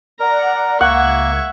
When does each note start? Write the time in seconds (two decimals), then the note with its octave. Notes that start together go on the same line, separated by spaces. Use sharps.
0.20 A#4 D5 F#5 A#5
0.81 C#2 A#3 E5 F#5 C#6 G#6